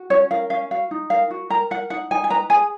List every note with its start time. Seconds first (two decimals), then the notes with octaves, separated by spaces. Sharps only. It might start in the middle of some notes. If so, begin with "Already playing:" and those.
Already playing: F#4
0.10 C#4 C#5
0.31 A#4 F5
0.50 C#4 F5
0.71 F#4 F5
0.91 D#4
1.10 A#4 F5
1.31 F#4
1.50 A#4 A#5
1.71 A#4 F#5
1.90 D#4 F#5
2.11 D#4 G#5
2.24 G#5
2.30 B4 A#5
2.50 G#4 G#5